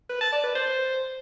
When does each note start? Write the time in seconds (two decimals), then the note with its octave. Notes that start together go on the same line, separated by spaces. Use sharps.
0.10 B4
0.21 A5
0.32 D5
0.44 B4
0.55 C5